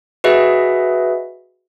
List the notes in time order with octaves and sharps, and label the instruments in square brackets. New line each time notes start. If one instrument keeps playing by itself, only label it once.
[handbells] F#4 G#4 B4 D#5 E5